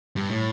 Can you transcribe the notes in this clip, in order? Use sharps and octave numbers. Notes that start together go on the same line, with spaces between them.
G2
A2